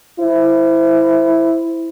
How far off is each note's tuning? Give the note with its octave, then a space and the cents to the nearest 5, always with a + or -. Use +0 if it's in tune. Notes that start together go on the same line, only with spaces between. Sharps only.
E4 +0 C5 -10